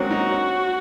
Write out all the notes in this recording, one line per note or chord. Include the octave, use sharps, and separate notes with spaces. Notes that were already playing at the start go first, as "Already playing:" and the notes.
Already playing: F#3 G#3 A#3 C4 C#4 F#4
D#4
C#4